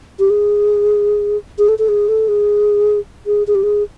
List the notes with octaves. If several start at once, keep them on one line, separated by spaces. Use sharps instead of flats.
G4
G#4
G#4
A4
A4
G#4
A4
G#4
G#4
G#4
G4
G#4